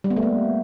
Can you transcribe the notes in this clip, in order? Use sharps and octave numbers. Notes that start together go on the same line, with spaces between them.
G3
B3
A3
A#3